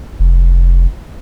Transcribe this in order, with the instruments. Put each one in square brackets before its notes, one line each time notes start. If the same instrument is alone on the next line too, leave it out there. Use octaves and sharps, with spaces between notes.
[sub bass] F1